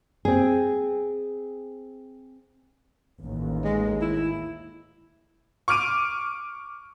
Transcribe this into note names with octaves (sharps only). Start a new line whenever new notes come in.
C4 G#4
A1 D#2
G#3
E4
C#6 D6 F6 D7 D#7